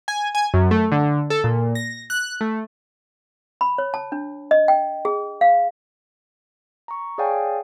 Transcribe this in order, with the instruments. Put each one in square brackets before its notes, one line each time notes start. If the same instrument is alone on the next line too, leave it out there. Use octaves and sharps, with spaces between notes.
[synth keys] G#5
G#5
F#2
A3
D3
A4
A#2
A#6
F#6
A3
[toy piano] B5
C#5
A5
D4
D#5
G5
G#4
F5
[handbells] A#5 C#6
G#4 C#5 D5 F5 G5 G#5